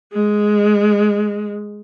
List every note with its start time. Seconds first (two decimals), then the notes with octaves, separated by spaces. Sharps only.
0.13 G#3